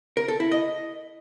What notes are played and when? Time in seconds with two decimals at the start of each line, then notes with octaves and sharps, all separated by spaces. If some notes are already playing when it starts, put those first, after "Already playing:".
0.17 A#4
0.28 A4
0.40 E4
0.51 D#5